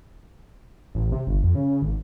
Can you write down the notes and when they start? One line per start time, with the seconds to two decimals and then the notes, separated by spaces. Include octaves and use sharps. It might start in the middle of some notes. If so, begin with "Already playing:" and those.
0.95 A1
1.12 C3
1.27 G1
1.43 F2
1.55 C#3
1.82 G#1